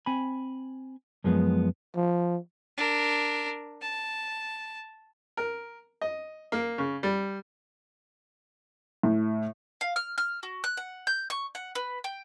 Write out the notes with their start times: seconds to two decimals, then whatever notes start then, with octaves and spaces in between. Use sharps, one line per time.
0.06 C4 G#5 B5
1.24 F#2 F3 G#3 B3
1.95 F3
2.78 D4 A#4
3.82 A5
5.37 A#4
6.01 D#5
6.52 A#3
6.78 C#3
7.03 G3
9.03 A2
9.81 F5
9.96 F6
10.18 F6
10.43 F#4
10.64 F#6
10.77 F#5
11.07 G6
11.30 C#6
11.55 F#5
11.75 B4
12.04 G5